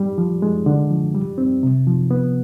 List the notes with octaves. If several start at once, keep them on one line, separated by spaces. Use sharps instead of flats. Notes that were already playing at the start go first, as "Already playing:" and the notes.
Already playing: G3
F3
G#3
D3
F3
G3
C4
C3
F3
B3